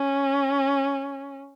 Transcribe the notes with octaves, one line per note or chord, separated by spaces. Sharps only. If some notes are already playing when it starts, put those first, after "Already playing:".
Already playing: C#4